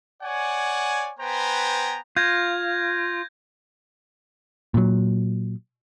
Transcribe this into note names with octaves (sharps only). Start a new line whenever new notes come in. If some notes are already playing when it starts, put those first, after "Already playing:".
C#5 D5 F#5 G#5
B3 B4 C5 G5 G#5 A#5
F4 G6 G#6 A#6
A#2 F#3